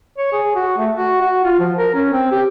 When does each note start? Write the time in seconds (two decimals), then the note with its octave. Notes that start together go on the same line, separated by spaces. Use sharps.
0.18 C#5
0.32 G#4
0.55 F#4
0.78 A3
0.96 F#4
1.21 F#4
1.45 F4
1.59 F3
1.77 A#4
1.94 C#4
2.13 C4
2.32 G4